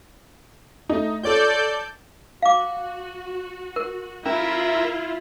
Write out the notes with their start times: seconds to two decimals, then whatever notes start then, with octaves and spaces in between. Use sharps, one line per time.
0.89 A3 D#4
1.23 F4 A4 C#5 D5 G6
2.42 F#4 F5 D6
3.76 A#4
4.26 C#4 E4 F4 A#4 E5